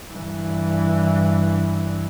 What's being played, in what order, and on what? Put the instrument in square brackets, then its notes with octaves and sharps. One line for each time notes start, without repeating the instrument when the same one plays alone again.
[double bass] G2 E3